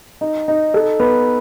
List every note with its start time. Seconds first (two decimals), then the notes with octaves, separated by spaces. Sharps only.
0.21 D#4
0.48 D#4
0.74 A4
1.00 B3